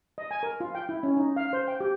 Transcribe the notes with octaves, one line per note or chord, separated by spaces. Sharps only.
D#5
G#5
A#4
F4
G5
E4
C#4
D#4
F5
C5
G5
G4